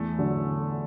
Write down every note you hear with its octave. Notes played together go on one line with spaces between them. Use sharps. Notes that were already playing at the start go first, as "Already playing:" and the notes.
Already playing: E2 A3
D3 F#3